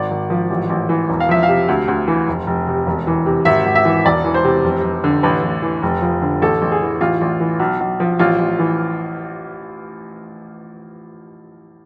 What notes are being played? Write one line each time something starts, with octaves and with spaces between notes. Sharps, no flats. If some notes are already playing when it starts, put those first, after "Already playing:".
Already playing: G#1 D5
G#1
F3
A1
A1
E3
E1
F5
F3 E5
F5
C3
D2
D2
E3
F1
F1
C3
E1
E3
C3
G#1 E5
G#1
E5
E3
E1 D5
E3
C5
C3
F1
F1
D3
A1 B4
A1
E3
F1
F3
D3
A1 A4
A1
G#4
E3
A1 F4
A1
E3
B1
B1
F3
A1 F4
A1
E3